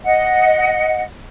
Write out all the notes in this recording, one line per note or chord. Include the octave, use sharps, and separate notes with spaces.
D#5 F#5